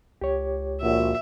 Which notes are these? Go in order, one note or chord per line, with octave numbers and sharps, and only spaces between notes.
C#2 G4 C#5
A#1 A#2 F#4 E5